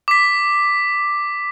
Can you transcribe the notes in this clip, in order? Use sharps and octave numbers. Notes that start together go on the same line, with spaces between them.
D6 B6